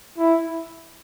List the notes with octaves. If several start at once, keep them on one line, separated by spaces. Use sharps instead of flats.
E4